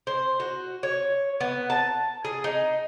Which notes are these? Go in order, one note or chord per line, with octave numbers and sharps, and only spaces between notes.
C5
F#4
C#5
B3
A5
G#4
D#4